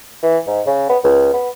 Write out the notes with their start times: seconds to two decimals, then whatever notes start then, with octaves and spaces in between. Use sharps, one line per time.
0.23 E3
0.47 G#2
0.67 C#3
0.89 B3
1.04 C#2
1.33 B3